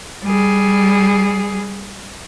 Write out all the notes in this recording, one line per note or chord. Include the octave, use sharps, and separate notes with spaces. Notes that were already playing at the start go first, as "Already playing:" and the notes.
G3 G#4